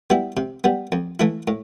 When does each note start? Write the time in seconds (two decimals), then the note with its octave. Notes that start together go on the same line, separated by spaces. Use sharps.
0.10 G3 B3 E4
0.37 C3
0.64 G3 B3
0.92 F2
1.20 E3 A3 E4
1.48 A2